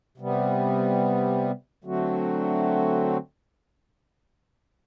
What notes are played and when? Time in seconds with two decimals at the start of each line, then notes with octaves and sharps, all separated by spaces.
0.18 C3 G3 B3
1.84 D3 F#3 A3 C4 F#4